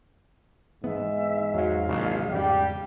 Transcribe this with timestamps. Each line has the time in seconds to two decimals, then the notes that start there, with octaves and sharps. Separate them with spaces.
0.84 G#2 E3 B3 E5
1.54 E2 F#3 F5
1.88 A#1 D#2 C3 F#3
2.32 E2 G#2 C#3 G3 G4